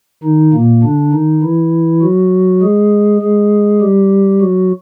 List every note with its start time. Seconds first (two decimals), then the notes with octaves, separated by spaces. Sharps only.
0.24 D#3 D#4
0.53 A#2 A#3
0.83 D3 D4
1.13 D#3 D#4
1.43 E3 E4
2.02 F#3 F#4
2.62 G#3 G#4
3.22 G#3 G#4
3.81 G3 G4
4.41 F#3 F#4